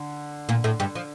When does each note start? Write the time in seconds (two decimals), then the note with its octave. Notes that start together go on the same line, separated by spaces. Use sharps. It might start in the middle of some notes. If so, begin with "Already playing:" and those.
Already playing: D3
0.49 A#2 A#3
0.64 A2 A3
0.80 G2 G3
0.95 F3